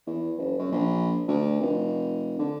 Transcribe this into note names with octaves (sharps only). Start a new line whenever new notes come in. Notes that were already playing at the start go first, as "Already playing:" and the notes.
E2
F#1
F#2
A#1
D2
F1
D3